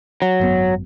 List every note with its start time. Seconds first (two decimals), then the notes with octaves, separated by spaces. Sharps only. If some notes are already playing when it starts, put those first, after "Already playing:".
0.22 F#3
0.40 G#1 F#2 B3